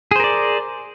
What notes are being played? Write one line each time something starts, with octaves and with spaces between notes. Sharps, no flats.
G#4 A#4 C5 D5